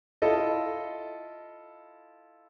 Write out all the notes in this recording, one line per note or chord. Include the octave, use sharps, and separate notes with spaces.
E4 F4 A4 D#5